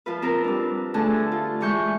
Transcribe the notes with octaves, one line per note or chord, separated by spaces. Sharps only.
F3 F4 B4
C4 A#4 B4
G3 D4
D3 A3 D4 G#4 A4
F4
E3 G#3 C#6 G6